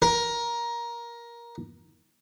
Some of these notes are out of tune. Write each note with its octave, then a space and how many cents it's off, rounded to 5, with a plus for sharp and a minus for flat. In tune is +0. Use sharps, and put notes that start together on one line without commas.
A#4 +15